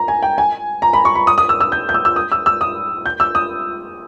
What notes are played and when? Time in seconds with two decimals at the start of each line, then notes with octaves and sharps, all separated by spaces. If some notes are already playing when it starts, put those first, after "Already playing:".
Already playing: A#5
0.08 G#5
0.22 G5
0.38 G#5
0.82 A#5
0.93 B5
1.05 C#6
1.15 B5
1.27 D#6
1.38 D#6
1.49 E6
1.61 E6
1.72 G6
1.89 G6
1.94 E6
2.05 E6
2.16 D#6
2.32 E6
2.46 E6
2.61 D#6
3.06 G6
3.20 E6
3.35 D#6